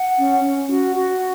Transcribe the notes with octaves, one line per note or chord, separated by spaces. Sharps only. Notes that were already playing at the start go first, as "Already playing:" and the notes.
Already playing: F#5
C#4
C#4
F#4
F#4